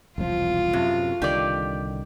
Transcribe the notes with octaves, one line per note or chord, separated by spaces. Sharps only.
E1 C2 F3 F4
F#2 A2 C3
C2 D3 D#3 G4 D5